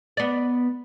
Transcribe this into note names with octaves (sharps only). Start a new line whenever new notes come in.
B3 D5